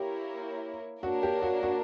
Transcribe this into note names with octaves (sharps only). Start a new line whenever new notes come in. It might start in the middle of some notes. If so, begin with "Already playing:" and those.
Already playing: A#3 E4 G4 A#4 C#5
A#3 D4 F#4 A#4 C#5
G4
F#4
F#4